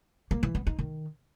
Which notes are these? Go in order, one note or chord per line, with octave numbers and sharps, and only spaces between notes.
A#3
E3
B3
D#4
D#3